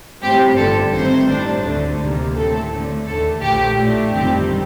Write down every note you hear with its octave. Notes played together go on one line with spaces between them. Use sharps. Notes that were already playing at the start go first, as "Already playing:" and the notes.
A2 G3 C4 G4
G1 G2 D3 F3 A4
G1 G2 D#3 A3 C4 C5
A2 G3 D4
D2 D3 A3
D2 C3 D#3 G3 A#3
A2 A3 C4 A4
D2 D3 A3
D#2 D3 A3 A4
A#1 A#2 F3 A3 G4
A2 A3 D4
G1 F2 D#3 G3 C4 G4